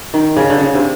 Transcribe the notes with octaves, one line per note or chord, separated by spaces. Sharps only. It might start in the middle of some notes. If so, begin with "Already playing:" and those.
D#3
C#3
D3
C#3
C3